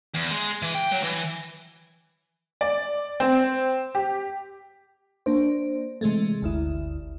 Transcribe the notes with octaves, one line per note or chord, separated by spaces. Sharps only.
E2
G#3
E3
G5
F#3
E3
D5
C4
G4
A#3 D4 C5
C3 E3 G#3 A3
G1 D2 E4